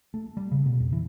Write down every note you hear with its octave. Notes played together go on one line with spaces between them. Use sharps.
A3
G3
C#3
B2
F2
E3